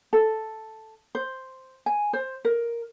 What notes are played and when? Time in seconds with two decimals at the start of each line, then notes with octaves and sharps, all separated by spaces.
0.13 A4
1.15 C5
1.86 G#5
2.13 C5
2.45 A#4